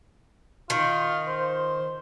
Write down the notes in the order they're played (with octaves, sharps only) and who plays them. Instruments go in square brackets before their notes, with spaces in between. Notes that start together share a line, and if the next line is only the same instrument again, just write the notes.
[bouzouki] D#3 [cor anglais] F4
[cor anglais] C5